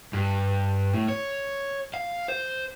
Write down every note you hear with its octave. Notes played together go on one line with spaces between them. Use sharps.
G2
A2
C#5
F5
C5